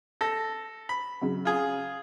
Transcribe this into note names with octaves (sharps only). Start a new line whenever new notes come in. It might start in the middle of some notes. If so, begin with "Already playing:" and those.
A4 A#6
B5
C#3 F#3
F4 G#4